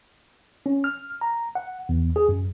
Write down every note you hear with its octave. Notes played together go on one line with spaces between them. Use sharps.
C#4
F6
A#5
F#5
E2
G#4
F#2